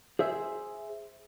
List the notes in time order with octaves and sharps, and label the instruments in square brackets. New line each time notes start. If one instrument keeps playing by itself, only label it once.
[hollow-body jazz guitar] G#4 C5 E5